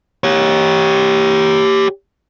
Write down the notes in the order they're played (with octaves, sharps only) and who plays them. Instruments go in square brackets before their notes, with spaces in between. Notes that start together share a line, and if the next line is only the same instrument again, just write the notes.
[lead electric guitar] G4 C#5